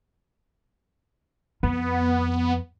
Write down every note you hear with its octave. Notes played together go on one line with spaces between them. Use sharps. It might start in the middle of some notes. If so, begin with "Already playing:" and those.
F2 B3